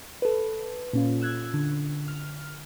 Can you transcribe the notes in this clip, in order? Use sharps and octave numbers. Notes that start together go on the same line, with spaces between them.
A4 B4
A#2 C#4 F4
E6 F#6 G#6
D3
F6